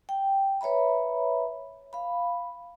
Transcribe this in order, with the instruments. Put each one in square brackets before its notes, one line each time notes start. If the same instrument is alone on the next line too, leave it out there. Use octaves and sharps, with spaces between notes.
[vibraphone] G5
B4 C#5 E5 A#5 B5
F5 B5